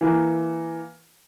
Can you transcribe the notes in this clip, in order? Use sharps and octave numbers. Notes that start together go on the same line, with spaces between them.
E3 A#3